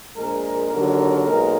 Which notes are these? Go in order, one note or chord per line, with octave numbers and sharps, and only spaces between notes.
A#1 A#2 G#3 A#4
D#2 D3 F#3 A#4
B1 A#2 G#3 A#4